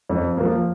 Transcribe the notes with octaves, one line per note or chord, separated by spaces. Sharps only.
F2
F3 A#3